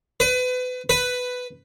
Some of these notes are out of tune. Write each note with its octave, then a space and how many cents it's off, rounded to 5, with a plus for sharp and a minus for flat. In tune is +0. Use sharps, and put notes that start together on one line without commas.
B4 +30
B4 +10